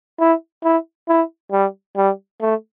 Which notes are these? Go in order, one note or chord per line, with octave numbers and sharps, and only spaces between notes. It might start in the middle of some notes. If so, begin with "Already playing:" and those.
E4
E4
E4
G3
G3
A3